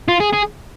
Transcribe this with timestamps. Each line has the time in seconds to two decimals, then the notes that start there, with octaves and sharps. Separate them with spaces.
0.08 F4
0.20 G#4
0.33 G#4